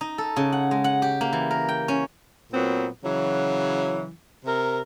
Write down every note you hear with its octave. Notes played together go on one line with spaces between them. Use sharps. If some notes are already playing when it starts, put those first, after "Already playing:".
D#4
A4
C#3
F#5
G#3
F#5
G4
A#3
E3
A#4
G5
C#4
A#2 F#3 B3 C4
C#3 E3 F#3
C3 A#4